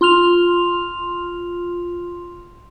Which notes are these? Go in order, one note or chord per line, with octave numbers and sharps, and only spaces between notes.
F4 C6 F6 F7